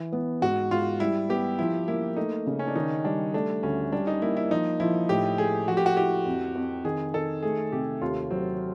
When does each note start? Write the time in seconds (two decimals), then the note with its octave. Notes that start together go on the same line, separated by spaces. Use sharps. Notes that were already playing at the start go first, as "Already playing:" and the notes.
Already playing: E3
0.12 B3
0.41 G#2 F#4
0.71 G#2 F4
1.00 G3 E4
1.29 B3 G4
1.59 F3 E4
1.88 A#3 E4
2.16 A3 D#4
2.47 C#3
2.59 C#4
2.67 D4
2.75 D#3 D#4
3.04 G3 D4
3.34 A3 D4
3.63 D2 C#4
3.92 G3 D4
4.07 D#4
4.22 A#3 E4
4.37 E4
4.51 F3 D#4
4.80 F3 E4
5.09 A2 G4
5.38 A3 G#4
5.68 F3 F#4
5.77 G4
5.86 F#4
5.97 E4 G4
6.26 F2
6.55 F2
6.84 D#3 G#4
7.14 D#3 A4
7.43 A3 G#4
7.72 C3 G4
8.01 D#2 F4
8.31 F#3 C4